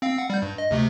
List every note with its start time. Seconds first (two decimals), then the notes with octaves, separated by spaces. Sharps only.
0.02 C4 F5
0.18 F#5
0.30 G3 G6
0.42 G2
0.58 D#5
0.71 D2 C3 A3